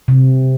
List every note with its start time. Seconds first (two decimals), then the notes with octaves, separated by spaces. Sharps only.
0.08 C3